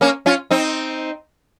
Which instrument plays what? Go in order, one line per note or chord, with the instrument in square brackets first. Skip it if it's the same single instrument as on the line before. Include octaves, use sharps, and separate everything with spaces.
[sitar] A#3 C#4
C#4 F4
C4 D#4